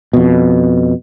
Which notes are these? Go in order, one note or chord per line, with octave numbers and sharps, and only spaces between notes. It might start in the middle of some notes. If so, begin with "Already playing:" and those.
F2 B2